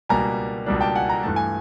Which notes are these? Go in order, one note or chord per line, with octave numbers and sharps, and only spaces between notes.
C#2 B2 G3 A#3 D4 G#5 A#5
C#2 B2 G3 A#3 D4
G5 A5
F#5 G#5
A#5
G2 E3 A3 A5
G#5